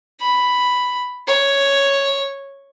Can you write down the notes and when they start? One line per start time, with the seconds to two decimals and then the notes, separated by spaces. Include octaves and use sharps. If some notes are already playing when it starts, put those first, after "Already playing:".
0.20 B5
1.28 C#5